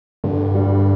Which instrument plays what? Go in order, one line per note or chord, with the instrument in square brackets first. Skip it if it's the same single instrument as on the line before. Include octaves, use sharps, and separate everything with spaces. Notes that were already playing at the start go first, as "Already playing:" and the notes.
[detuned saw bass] G2 [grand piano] D3
[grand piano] G3 D4